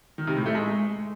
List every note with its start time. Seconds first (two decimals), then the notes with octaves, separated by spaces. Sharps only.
0.18 D#3
0.27 C3
0.36 A2
0.46 A3
0.55 G#3